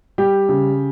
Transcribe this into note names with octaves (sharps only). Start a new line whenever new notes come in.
G3 G4
C#3